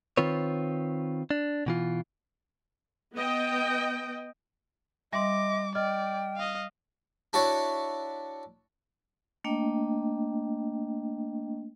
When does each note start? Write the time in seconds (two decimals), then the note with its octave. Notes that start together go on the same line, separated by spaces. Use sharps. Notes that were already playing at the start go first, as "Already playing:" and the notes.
0.17 D#3 C4 F4 B4 C#5
1.31 D4
1.66 B2 E3 F4
3.14 B3 D#5 G5
5.13 G3 D#5 E5 C6 D6
5.75 D5 D#5 G5 F6
6.37 D#5 F5
7.33 D4 E4 F#4 C#5 D5
9.44 A3 A#3 D4 D#5 G5